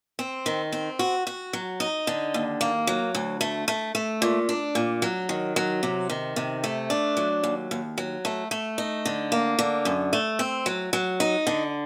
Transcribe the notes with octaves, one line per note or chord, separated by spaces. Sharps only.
C4
D#3
C4
F#4
F#4
F#3
D#4
D3
D#2
A#3
F#3
D2
A3
A3
A3
A#2
D4
A#2
F#3
D#3
F#3
C3
D#3
C3
A3
D4
F#3
D#2
D#2
F#3
A3
A3
D#4
D3
A#3
D3
F#2
A3
C4
F#3
F#3
D#4
D3